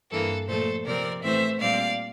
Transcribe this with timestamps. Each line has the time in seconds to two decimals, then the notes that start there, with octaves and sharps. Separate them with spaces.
0.11 G2 E3 A#3 A4
0.48 A#2 F3 A3 A4 C5
0.85 C3 F3 C4 A#4 D5
1.23 A2 E3 A3 C4 C5 E5
1.60 A#2 G3 C4 D5 F5